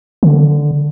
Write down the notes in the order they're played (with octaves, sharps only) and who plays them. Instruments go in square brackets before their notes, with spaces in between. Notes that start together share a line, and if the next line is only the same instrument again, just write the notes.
[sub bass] D3